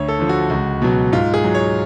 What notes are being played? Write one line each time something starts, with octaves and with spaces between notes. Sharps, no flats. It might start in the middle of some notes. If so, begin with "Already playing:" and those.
Already playing: D2 C#5
A4
D3 F3
F#4
C#2 F#4
B2 F#3
G#2 F4
G#4
F#3
C#5